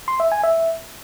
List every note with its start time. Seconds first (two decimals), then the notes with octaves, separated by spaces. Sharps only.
0.08 C6
0.20 E5
0.32 G#5
0.43 E5